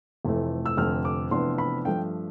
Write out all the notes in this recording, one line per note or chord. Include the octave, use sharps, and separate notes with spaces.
F1 F2 E3 A3
E6
F1 F2 D3 F6
D6
F1 F2 E3 B3 D4 C6
B5
G2 F3 A3 D4 G5